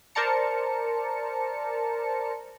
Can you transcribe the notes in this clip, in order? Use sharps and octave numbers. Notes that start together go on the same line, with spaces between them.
A#4 C5 D5 A5 A#5 C#7